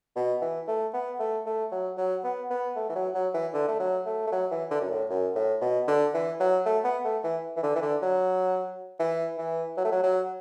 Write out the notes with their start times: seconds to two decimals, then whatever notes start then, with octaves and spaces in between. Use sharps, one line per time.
0.16 B2
0.41 E3
0.68 A3
0.94 B3
1.19 A3
1.46 A3
1.72 F#3
1.97 F#3
2.24 B3
2.50 B3
2.76 A3
2.89 E3
2.95 F#3
3.15 F#3
3.34 E3
3.53 D3
3.68 A3
3.80 F#3
4.06 A3
4.27 A3
4.32 F#3
4.51 E3
4.71 D3
4.81 F#2
4.90 A2
5.10 F#2
5.35 A2
5.61 B2
5.88 D3
6.14 E3
6.40 F#3
6.65 A3
6.84 B3
7.04 A3
7.24 E3
7.56 E3
7.63 D3
7.76 E3
7.82 D3
8.02 F#3
8.99 E3
9.38 E3
9.77 F#3
9.84 A3
9.92 F#3
10.03 F#3